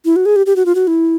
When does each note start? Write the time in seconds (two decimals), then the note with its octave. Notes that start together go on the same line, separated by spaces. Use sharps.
0.05 E4
0.16 F#4
0.26 G#4
0.36 G4
0.46 G4
0.56 F#4
0.66 F4
0.75 F#4
0.87 E4